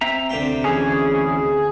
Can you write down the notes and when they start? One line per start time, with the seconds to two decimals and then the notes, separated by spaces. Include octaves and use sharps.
0.01 C4 E5 A#5
0.29 D2 C3 G5
0.64 E3 C#4 G#4